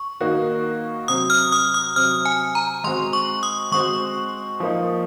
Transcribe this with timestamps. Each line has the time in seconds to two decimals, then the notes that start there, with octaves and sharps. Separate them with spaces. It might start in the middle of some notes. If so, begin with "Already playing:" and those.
Already playing: C#6
0.21 D#3 A#3 D#4 F#4
1.08 C3 F#3 C4 D#6
1.30 F6
1.52 D#6
1.74 D#6
1.96 C3 F#3 C4 F6
2.25 G#5
2.55 A#5
2.84 G#3 C4 F#4 C5 C6
3.13 C#6
3.43 D#6
3.72 G#3 C4 F#4 C5 C#6
4.60 F3 A#3 D#4